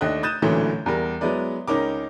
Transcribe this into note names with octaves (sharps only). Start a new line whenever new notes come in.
D#2 A3 D4 D#5 F#6
D#6 F#6 G6 A6 D#7 E7
A1 A#2 D3 E3 F#3 A3
E2 G3 A#4
F#3 G#3 B3 E4 B4 D5
C#2 C#4 D#4 A#4 D6